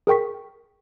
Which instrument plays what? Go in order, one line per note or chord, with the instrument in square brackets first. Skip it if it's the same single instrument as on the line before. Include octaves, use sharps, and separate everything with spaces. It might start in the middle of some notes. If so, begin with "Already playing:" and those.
[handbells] G#4 A#4 G5 C#6 B6